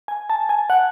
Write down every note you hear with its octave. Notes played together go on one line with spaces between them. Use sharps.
G#5
A5
G#5
F#5